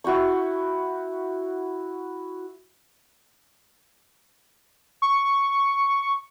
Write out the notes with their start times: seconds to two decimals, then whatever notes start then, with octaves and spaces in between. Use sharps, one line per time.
0.04 E4 F#4 G5 C#6
5.02 C#6